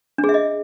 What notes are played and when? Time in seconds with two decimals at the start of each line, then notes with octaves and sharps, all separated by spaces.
0.18 D4
0.24 G#4
0.29 E5
0.34 D#5